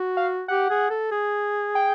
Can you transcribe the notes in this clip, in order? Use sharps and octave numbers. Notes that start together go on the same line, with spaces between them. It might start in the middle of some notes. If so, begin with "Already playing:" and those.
Already playing: F#4
F5
G4 F#5
G#4
A4
G#4
G5